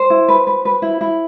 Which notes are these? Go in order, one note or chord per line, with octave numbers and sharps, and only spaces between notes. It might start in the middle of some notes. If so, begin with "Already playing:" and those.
Already playing: C5
E4
B4
B4
B4
E4
E4